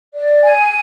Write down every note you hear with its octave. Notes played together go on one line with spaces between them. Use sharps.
D5
G#5